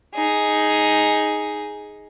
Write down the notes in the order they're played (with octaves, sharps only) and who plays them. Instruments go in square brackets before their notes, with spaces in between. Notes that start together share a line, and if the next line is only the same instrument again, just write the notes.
[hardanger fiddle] D#4 G#4